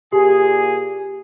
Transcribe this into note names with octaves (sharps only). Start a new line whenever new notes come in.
A#2 G4 G#4